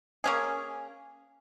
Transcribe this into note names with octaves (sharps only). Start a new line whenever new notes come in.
A#3 C#4 G#4